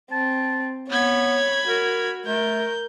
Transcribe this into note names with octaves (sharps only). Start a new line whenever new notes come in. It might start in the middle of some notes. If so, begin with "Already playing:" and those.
C4 A5
B3 C#5 B5 G#6
F#4 A#4
A3 A#4 G6